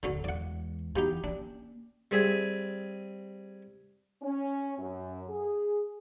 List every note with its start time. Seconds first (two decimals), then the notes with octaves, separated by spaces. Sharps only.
0.03 D1 D2 D3 F#3 C#4
0.24 E2 G#3 D5 F#5
0.96 B2 E3 B3 D#4 G4
1.24 A#3 C#4 D4
2.11 G3 C4 G#4 E5 G#5
4.22 C#4
4.78 F#2
5.29 G#4